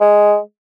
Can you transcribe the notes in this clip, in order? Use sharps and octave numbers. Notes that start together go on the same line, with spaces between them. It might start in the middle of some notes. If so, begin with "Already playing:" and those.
G#3